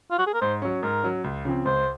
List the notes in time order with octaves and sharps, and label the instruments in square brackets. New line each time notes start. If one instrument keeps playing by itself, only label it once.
[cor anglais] F4
F#4
G#4
A#4
[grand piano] G#2 [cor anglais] C5
[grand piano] F#3 C#4
[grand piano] G#2 [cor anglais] A#4
[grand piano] F#3 C#4
C#2
C#3 F3 C4
[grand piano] C#2 [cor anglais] C5